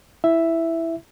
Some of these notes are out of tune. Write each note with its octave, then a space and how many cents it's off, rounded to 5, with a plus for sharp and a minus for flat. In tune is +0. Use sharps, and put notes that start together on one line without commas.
E4 +0 E5 +0